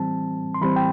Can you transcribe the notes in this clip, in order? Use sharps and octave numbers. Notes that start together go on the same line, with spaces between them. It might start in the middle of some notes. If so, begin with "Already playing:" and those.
Already playing: E3 G3 C4 A5
C6
E3 G3 C4 B5
G5